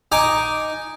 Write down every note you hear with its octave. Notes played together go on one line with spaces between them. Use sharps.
D#4 G#5 D6